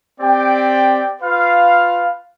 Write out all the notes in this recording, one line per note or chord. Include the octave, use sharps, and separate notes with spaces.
C4 G4 D5 G5
F4 B4 F5